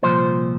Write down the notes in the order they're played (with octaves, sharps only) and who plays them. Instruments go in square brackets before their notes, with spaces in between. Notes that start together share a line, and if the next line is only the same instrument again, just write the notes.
[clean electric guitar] C2 A#2 F3 C5